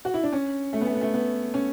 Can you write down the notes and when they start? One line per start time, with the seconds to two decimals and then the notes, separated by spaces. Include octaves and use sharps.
0.05 F#4
0.14 E4
0.23 D4
0.33 C#4
0.73 A3
0.81 B3
0.87 A3
0.95 B3
1.01 A3
1.13 B3
1.54 C#4